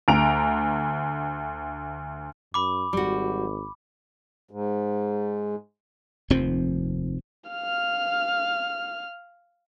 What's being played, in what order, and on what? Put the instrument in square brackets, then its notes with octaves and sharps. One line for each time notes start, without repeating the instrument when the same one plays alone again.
[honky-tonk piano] D2 A#5 D7 F7
[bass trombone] F#2 [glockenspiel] B5 D6
[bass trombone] G#1 [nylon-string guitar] G3 F#4
[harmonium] G#2
[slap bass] F1 D#2 F3 C4
[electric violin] F5 F6